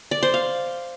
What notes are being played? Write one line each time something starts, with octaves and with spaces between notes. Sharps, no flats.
D5
C5
F5